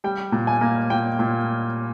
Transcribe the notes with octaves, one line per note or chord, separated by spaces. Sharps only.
G3 G5
A#2
G#5
A#3
A#2 G5
A#2